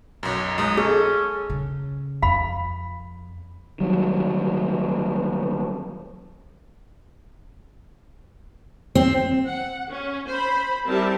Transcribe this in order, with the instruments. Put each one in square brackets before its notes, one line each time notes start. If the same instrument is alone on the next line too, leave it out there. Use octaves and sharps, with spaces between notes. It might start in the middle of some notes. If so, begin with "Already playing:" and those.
[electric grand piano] B1 F#2
[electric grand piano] B1 G#3 [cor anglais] D#4
[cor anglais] C#4 [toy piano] G#4 [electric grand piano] A4
[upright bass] C#3
[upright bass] F2 [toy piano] F5 B5
[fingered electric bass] D#3 F#3 G3
[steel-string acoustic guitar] C4
[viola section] F#5
C#4
C5 B5
G3 C4 E4 G4 A#4 A5